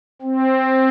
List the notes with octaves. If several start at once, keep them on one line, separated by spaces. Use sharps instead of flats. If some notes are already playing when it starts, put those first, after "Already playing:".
C4